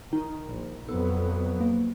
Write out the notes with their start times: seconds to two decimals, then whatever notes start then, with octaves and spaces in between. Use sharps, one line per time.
0.13 D#3 D#4
0.48 A#1
0.88 F2 F#3 B3 A4
1.60 A#3